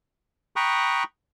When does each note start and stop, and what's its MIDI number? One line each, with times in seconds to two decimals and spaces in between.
0.56 1.03 79
0.56 1.03 82
0.56 1.03 83
0.56 1.03 85
0.56 1.03 87
0.56 1.03 90